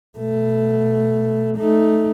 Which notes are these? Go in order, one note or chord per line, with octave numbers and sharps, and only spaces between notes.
B2 A3
A3 D#4